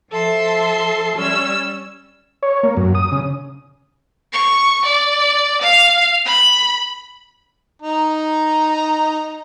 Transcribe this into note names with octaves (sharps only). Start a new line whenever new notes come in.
F3 A4 E5 C6
G3 C#4 E6
C#5
A#3
F#2
D#6
C#3
C#6
D5
F5
B5
D#4 A#5